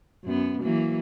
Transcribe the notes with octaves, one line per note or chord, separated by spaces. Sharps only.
F#2 B3
E3 F#3 A#3